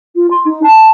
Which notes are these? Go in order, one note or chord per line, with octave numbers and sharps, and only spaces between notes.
F4
C6
D#4
A5